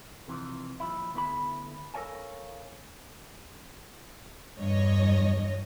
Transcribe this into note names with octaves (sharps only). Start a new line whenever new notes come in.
C3 E3 F3
D#2 F3 E4
D2 B3 E4 A4 B5
A4 A#4 C#5 D5 F5 G#5
E2 G2 C#5 D#5